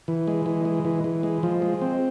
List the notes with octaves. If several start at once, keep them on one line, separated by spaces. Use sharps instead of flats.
E3
G#3
E3
G#3
E3
E3
G#3
F3
G#3
C4